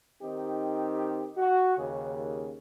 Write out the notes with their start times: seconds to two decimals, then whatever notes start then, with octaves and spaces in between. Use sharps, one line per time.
0.21 D#3 C4 D#4 G4
1.37 F#4
1.77 D#2 C#3